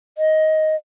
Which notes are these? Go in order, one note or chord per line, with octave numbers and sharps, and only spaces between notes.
D#5